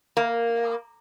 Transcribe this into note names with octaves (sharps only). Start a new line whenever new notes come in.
A#3